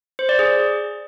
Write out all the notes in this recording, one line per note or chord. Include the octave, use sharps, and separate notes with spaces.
C5
D5
G#4